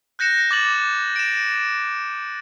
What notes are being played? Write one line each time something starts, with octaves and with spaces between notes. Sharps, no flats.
F#6 G6 A#6 C#7 E7
D6 A6 F#7
D7 E7